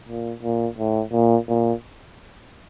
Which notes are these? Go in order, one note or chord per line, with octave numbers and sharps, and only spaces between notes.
A#2
A#2
A2
A#2
A#2